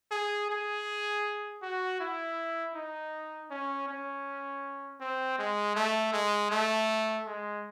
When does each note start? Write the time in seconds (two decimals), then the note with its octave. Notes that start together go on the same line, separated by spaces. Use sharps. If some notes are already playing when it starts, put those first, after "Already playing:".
0.11 G#4
0.50 G#4
1.62 F#4
2.00 E4
2.75 D#4
3.51 C#4
3.88 C#4
5.00 C4
5.39 G#3
5.75 A3
6.13 G#3
6.50 A3
7.26 G#3